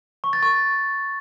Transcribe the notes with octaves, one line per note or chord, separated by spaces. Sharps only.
C#6
A6
C#6